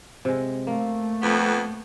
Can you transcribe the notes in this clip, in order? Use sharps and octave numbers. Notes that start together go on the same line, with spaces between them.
C3 G#3
A3 A#3
F2 B3